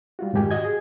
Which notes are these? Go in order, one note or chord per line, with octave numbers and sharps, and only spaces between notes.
G3 F4 F#4
F2 G#2 D#3 G4 G#5
F#4 D#5 G#6
G#4